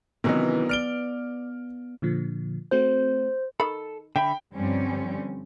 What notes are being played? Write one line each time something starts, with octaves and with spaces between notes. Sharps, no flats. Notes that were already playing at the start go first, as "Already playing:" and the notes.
C3 D#3 E3 F#3 B3 C#4 D#4
D5 F6 D7 G7
A#2 D3 F3
A3 C4 F#4 C5
D#3 A4 B5
D3 E5 G5 B5
G2 D3 F3 G3 C4 C#4